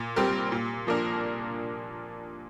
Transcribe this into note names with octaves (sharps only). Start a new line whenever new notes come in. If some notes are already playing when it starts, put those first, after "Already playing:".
Already playing: A#2
G3 C4 G4 A#4
A#2
F3 A#3 D4 A#4